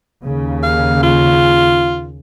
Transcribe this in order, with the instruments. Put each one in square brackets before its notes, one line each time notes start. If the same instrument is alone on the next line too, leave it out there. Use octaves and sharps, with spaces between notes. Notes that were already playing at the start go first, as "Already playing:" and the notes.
[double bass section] D#2 C#3
[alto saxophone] F5
F4